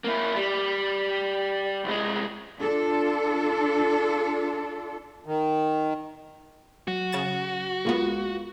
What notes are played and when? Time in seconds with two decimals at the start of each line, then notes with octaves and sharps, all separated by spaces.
0.04 A#3 E4
0.36 G3
1.84 C2 G#3
2.60 D4 F4 A4
5.26 D#3
6.88 F#3 F#4
7.12 C#3 A6 E7
7.85 B1 G#3 A#3 B3 F4